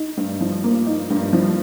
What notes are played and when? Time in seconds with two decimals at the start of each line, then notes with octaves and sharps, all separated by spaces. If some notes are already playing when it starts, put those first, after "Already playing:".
Already playing: D#4
0.17 G2
0.41 F3
0.64 A#3
0.86 D#4
1.10 G2
1.33 F3